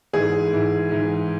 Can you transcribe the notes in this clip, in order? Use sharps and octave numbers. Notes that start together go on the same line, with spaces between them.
G#2 E3 G#4
G#2 E3
G#2 E3